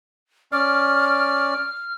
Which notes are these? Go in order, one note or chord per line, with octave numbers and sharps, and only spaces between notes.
C#4 D5 F6